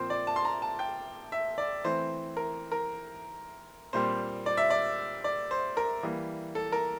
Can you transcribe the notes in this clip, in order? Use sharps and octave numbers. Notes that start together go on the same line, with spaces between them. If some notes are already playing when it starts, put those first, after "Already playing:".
Already playing: A#2 F3 C4 C5
D5
A5
C6
A#5
A5
G5
E5
D5
E3 A3 C4 C5
A#4
A#4
A#2 G3 C4 C5
D5
E5
D5
D5
C5
A#4
E3 G3 A#3
A4
A#4